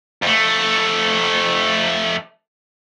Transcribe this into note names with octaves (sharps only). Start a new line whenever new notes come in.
F2 A3